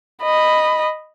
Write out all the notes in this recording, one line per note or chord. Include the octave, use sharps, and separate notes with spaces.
D#5 B5